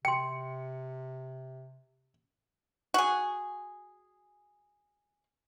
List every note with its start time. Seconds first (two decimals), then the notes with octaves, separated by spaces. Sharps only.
0.05 C3 G5 C6 C#7
2.94 F#4 G#4